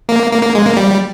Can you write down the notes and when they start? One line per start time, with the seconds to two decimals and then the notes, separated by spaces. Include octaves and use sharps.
0.09 A#3
0.31 A#3
0.42 A#3
0.55 G#3
0.66 A#3
0.76 G3